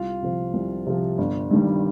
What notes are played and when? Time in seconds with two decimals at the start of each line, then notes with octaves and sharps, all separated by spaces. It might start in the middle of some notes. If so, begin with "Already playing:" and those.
Already playing: C2 F4 F5
0.22 C3 F3
0.54 C2
0.87 C3 F3
1.18 G1
1.51 G2 D#3 G3